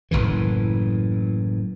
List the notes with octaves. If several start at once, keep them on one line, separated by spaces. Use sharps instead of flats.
F#1 B1 A2 E3